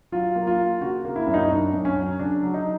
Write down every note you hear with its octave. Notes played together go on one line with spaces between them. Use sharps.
F#3 F4
A#3
F4
A#3
C#3 F#4
A#3
E4
F#2
D#4
F#2 D4
F#2
C#4
F#3
C#3 D4
F#3
D#4